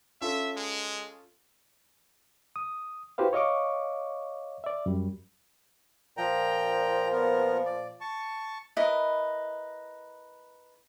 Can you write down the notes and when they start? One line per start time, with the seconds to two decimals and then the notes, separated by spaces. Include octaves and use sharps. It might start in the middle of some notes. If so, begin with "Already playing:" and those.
0.21 C#4 F4 A4 E5
0.56 G#3
2.56 D#6
3.18 E4 F#4 G4 B4 C5 F5
3.33 C#5 D#5 F5 C#6 D6
4.64 D5 E5
4.86 F#2 G3
6.17 A#2 F3 G5 A#5
7.12 B3 A#4
7.65 D5
8.01 A5 C#6
8.77 E4 A#4 B4 D#5